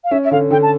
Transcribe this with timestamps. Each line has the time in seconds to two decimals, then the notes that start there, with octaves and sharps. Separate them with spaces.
0.04 F5
0.11 C#4 E5
0.24 E5
0.31 D3 F5
0.51 D3 G5
0.62 A5